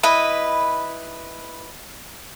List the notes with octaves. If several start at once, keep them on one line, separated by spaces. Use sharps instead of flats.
E4 B4 D#5 B5